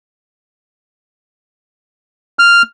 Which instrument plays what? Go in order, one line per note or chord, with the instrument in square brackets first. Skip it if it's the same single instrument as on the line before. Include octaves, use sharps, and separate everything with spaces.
[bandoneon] F6